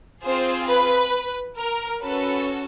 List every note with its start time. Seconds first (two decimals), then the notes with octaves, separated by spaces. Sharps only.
0.23 C4 F4 G#4 C5
0.68 B4
1.57 A#4
2.02 C#4 F#4 A4 B4